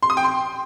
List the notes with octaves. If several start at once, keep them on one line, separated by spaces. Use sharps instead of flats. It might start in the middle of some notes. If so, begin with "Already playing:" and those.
C6
D#6
G5
C6